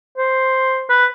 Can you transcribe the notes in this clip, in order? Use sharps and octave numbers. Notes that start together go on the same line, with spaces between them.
C5
B4